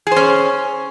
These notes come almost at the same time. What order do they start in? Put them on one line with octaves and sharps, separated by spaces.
G#4 C5 C#4